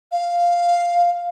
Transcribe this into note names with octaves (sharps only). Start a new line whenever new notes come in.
F5